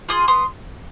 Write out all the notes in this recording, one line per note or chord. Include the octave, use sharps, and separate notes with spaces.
F4 G#4 C6 D#6
B3 C6 D#6